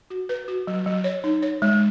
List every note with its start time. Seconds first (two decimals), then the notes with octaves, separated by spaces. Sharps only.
0.10 F#4
0.29 B4
0.48 F#4
0.67 F#3
0.86 F#3
1.04 C#5
1.24 D#4
1.42 C#5
1.62 G#3